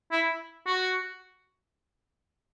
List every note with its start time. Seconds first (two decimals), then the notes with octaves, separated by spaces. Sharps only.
0.11 E4
0.66 F#4